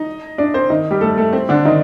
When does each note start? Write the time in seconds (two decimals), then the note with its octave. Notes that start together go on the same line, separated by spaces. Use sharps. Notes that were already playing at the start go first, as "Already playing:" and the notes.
Already playing: D#4 D#5
0.38 D4 D5
0.54 C4 C5
0.70 D#3 D#4
0.91 G3 G4
1.01 A3 A4
1.17 A3 A4
1.33 C4
1.49 D3 D4
1.65 D#3 D#4